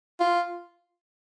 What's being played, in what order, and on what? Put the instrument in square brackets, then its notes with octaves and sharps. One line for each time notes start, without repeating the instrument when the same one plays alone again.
[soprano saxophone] F4